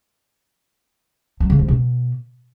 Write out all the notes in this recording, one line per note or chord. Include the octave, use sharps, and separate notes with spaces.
F#3
C#3
F3
B2